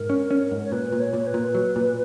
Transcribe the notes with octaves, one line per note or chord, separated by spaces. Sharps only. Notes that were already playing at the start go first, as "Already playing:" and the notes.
Already playing: G#2 A#4
C#4
C#4
G#2
C#5
A#2 B4
A#2
C#5
A#2
B4
A#2
F#3
A#2